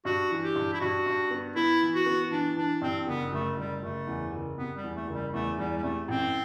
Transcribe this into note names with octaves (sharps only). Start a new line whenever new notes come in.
G2 F#4
E3
G4
G2
E4
G2 F#4
G2
B3
B3 E4
E3
F#4
B3
E3 D4
E3 D4
G2 C4
F#1 B3
F#1 A3
F#1 G3
F#1 A3
E2
F#1
C3 B3
G3
E2
A3
F#1
G3
E2 A3
E2 G3
G3
C3 A3
A1 C4